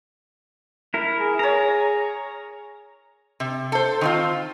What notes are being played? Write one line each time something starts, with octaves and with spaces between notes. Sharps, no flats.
E4 A#4
G#4
A#4 C#5 A#5
C3
A4 C5
D#3 C4 F4